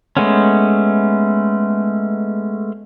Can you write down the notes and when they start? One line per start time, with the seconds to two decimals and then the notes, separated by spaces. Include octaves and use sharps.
0.17 G#3 A3 B3 C#4